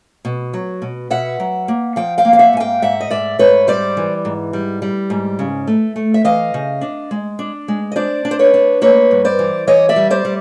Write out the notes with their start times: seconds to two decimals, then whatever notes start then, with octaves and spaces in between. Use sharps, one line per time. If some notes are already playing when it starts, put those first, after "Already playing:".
0.25 B2
0.54 F#3
0.82 B2
1.10 B2 E5 F#5
1.40 F#3
1.68 A#3
1.96 F3 F5 G5
2.18 F5 G5
2.25 A#3
2.33 F5
2.39 E5 F#5
2.53 G#2 G#5
2.60 F5 G5
2.82 G#2 E5 F#5
3.01 D#5
3.10 G#2 D5 E5
3.39 G#2 B4 C#5
3.67 G3 C5 D5
3.97 E3
4.25 G#2
4.53 G3
4.82 G3
5.10 G#2
5.39 C#3
5.67 A3
5.96 A3
6.14 E5
6.24 E3 D#5 F5
6.54 C#3
6.81 D4
7.11 G#3
7.39 D4
7.68 G#3
7.92 D#5
7.96 D4 C5 D5
8.25 D4
8.31 C5
8.39 B4 C#5
8.54 D4
8.82 A#3 B4 C#5
9.11 G2
9.25 C5 D5
9.39 E3
9.67 E3 C#5 D#5
9.89 D5 E5
9.96 G3
10.10 C5 D5
10.25 G3